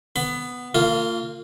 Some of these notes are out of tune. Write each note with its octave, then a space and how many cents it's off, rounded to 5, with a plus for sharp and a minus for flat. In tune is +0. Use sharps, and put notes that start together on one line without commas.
B3 +0 B5 +30
A#3 -35 F4 +0